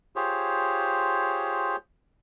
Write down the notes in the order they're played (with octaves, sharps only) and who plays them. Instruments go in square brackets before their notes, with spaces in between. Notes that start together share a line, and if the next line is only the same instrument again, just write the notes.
[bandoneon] F4 G4 G#4 C5 C#5